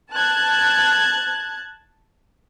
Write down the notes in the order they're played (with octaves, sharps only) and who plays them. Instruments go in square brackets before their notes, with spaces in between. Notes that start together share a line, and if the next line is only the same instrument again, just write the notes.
[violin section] A5 F#6 G#6